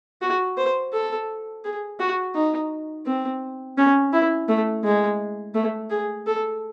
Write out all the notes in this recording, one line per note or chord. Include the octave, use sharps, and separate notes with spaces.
F#4
C5
A4
G#4
F#4
D#4
C4
C#4
E4
A3
G#3
A3
G#4
A4